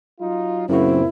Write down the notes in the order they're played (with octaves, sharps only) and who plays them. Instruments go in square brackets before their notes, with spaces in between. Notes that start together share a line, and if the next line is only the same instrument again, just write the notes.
[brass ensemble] F#3 D#4 F4
[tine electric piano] F#2 C#3 F#4 [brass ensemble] A#2 B3 C4 [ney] E4